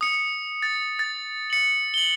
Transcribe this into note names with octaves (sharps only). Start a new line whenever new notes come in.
D#6 C#7
A6
A6
C#7 F#7
F#7 G7